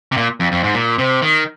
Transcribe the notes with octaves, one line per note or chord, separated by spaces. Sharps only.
C3
A#2
F2
F2
G#2
A#2
C3
D#3